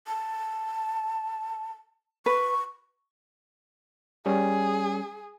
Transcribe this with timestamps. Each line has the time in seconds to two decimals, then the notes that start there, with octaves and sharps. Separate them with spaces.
0.07 A5
2.26 B4 C#6
4.26 G3 C#4 G#4